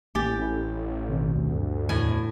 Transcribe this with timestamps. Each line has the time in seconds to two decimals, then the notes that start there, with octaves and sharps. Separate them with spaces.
0.15 A1 A#3 G4 G#5 A6
0.38 C#4 E4
1.09 B2 D#3 C4
1.36 D2
1.53 G2
1.89 E2 A2 G#5